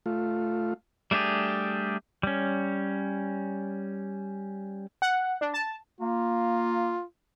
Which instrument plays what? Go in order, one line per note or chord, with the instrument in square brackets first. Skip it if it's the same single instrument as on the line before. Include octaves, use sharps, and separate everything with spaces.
[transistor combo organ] A3 F4
[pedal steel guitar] G3 A3 D4 G4 G#4
G3 C#4
[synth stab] F#5
D4
A5
[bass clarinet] A#3 [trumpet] F4